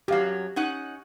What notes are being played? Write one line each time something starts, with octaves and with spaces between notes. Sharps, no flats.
F#2 F#3 G4 F5
C#4 D#4 F#5